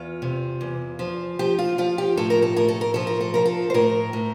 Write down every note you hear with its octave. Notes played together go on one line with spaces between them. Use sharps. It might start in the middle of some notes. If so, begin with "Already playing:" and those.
Already playing: E2 F4
C3
E2
F3
F3 G4
F4
F3 F4
G4
A2 A4
A#4
A4
A2 A#4
A4
A#4
F3 A4
A#4
A4
F3 A#4
A4
C5
A2 A#4
A2